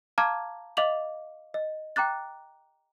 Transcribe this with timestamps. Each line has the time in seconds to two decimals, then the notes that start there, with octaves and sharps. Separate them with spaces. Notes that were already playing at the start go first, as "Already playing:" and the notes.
0.18 F5 A5 A#5 D6 F6 G#6
0.77 D#5 F5 D6 F7 F#7
1.54 D#5
1.96 G5 A#5 D6 F#6 A6